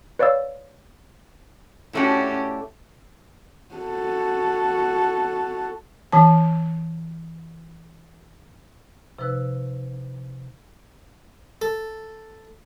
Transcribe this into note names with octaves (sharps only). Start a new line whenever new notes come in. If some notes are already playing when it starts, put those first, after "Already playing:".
B4 C#5 D5 F5 E6
A2 A3 C#4 D4 F#4 G4
F#4 A4
E3 A5
C3 F3 D#4 B4 E6 F#6
A4